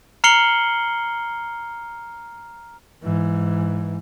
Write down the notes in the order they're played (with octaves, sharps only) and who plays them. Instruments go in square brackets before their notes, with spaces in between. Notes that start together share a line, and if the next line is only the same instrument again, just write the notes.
[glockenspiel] A#5 F6 C7 C#7 F#7 G7
[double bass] G#2 E3